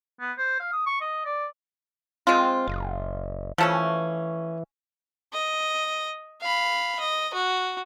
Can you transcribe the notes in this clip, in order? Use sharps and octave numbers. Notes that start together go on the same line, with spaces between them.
B3
C5
F5
D#6
C#6
D#5
D5
G#3 C4 F4
F#1
E3 F3 A3 C#4
D#5
F5 B5
D#5
F#4